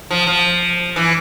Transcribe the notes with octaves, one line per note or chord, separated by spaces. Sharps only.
F3
F3
E3